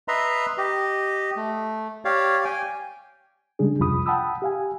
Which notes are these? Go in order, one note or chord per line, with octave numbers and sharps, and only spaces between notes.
B4 D#5 E5 A#5 C6
G4 D#5
A3
G4 C#5 D5 F5
G5 G#5
C#3 G3 G#3 D4 G#4
C2 F2 C3 F4 B5 D#6
F#5 G5 A5 B5 D#6 E6
G4 F5 G#5